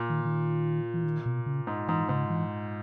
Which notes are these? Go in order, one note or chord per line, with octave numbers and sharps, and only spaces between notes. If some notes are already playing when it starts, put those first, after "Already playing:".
Already playing: A#2
D#3
D#3
E3
D#3
B2
C#3
G#2
G#2 E3
G#2 C#3
E3